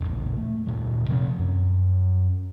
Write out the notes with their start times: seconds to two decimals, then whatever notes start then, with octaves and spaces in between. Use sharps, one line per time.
0.01 E1 A#1
0.36 A3
0.67 D2 A#2 G3
1.08 C3 F3 A3 C4
1.39 F#2